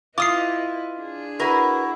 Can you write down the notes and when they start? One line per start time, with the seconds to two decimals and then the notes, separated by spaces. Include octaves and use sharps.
0.18 E4 F4 B4 D#5 D6 D#6 C7
0.98 D4 G#4
1.40 E4 F#4 A#4 B4